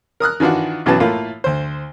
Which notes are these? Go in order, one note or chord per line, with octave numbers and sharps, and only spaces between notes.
A#4 D#6 F6 F#6
D#3 E3 D4 F4 F#4
B1 F#2 E3 F#3 B3 A5
A2 A3 A#3 F4
D2 C5